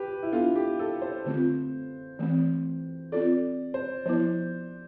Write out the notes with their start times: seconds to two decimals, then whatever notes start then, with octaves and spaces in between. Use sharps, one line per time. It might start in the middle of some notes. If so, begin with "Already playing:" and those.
Already playing: G4 B4
0.23 E4
0.32 B3 D4 F4 A4
0.56 G4
0.79 A4
1.02 C5
1.26 D3 A3 C4 F4
2.19 E3 A3 C4
3.12 C4 F4 A4 D5
3.74 C5
4.06 F3 B3 E4 C5